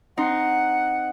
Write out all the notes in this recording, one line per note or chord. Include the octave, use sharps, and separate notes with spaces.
C4 D#4 F#5 C6